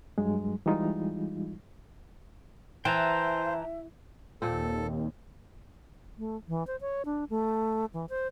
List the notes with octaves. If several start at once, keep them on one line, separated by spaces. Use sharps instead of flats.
G2 F#3 G#3
E3 G3 G#3 D#4 F4
E3 C5 E5 G5 A5 A#5
D#2 A#2 C4 A4
A3
E3
C5
C#5
D4
A3
E3
C5